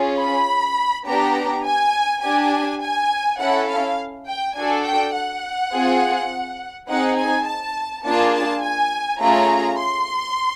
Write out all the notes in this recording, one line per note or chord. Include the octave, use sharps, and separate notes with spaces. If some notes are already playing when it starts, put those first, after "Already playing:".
Already playing: C#4 F4 G#4
B5
B3 D4 G4 A#5
G#5
D4 G4 G#5
G#5
C#4 E4 A4 F#5
F5
G5
D4 F#4 A4 G#5
G5
F#5
C4 F4 G#4
C4 D#4 G#4 F#5
G#5
A5
A#3 D4 F4 G#4 A5
A5
G#5
A3 C#4 F4 G#4 A#5
C6